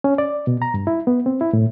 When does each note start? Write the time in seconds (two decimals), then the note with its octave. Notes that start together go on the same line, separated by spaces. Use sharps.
0.04 C#4
0.18 D5
0.47 B2
0.62 A#5
0.74 G2
0.87 E4
1.07 B3
1.26 C4
1.41 E4
1.53 A2